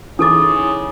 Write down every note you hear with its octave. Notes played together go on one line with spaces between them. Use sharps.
C#3 E3 D#4 A4 D6 D#6 A6